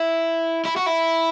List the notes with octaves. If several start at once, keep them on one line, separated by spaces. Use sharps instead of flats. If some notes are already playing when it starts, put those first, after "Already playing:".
Already playing: E4
E4
F#4
E4